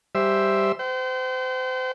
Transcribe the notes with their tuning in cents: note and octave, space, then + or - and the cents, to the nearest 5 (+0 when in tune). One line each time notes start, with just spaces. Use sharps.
G3 +0 C5 +0 E5 +0
C5 -30 G5 -40